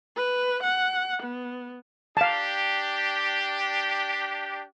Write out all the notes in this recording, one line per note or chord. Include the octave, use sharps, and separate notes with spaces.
B4
F#5
B3
D4 G4 F5 A5